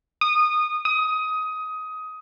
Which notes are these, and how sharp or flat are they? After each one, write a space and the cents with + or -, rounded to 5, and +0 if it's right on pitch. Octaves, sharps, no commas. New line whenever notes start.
D#6 -20
D#6 +20